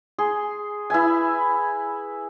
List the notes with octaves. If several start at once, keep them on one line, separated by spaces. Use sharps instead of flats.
G#4 C6
E4 B4 E5 G#5